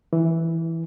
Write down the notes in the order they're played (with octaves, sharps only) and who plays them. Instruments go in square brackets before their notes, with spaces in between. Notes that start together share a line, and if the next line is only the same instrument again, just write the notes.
[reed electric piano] E3